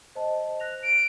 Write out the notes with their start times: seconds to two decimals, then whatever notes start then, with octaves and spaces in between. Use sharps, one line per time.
0.15 C5 D#5 A5
0.60 F#6 A#6 F7
0.83 D7